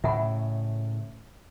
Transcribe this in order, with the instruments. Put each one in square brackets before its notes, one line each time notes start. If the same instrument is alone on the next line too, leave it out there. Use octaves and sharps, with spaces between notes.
[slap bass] A2 C#3 [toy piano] E5 F#5 B5